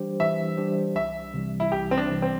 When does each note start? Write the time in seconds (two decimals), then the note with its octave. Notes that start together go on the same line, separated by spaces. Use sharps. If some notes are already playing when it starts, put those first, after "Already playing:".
Already playing: E3 G3 D4 G4 C5
0.20 E3 E5
0.57 G3 D4 G4 C5
0.95 C2 E5
1.34 C3 E3 G3
1.60 E4
1.71 C2 G4
1.91 C4
1.98 D4
2.10 C3 E3 G3
2.22 C4